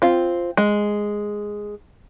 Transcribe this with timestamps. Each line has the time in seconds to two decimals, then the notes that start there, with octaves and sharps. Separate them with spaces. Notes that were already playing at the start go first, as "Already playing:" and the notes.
0.02 C4 F4
0.57 G#3